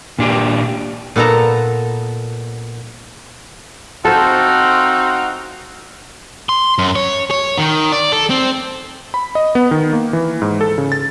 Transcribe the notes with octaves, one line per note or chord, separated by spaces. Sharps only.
A#2 D4 G4
A#2 B3 A4 A5 A#5
C4 D#4 F4 F#4 A4 C5
C6
F#2
C#5
C#5
D#3
D5
A4
C4
B5
D#5
B3
D#3
A#3
E3
G#2
A4
C#3
A6